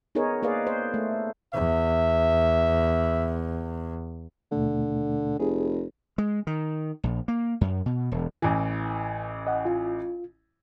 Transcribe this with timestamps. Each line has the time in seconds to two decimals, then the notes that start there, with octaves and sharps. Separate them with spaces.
0.15 B3 D#4 G#4 A#4 C#5
0.42 A#3 G#4 B4 D5 D#5 F5
0.67 C5
0.94 A3
1.54 E2 E5
4.52 D#2 B2 D3 A3
5.39 F1 G#4
6.18 G#3
6.47 D#3
7.03 A#1
7.28 A#3
7.61 F#2
7.86 B2
8.12 E1
8.42 A1 E3
9.47 D#5 F#5
9.65 F4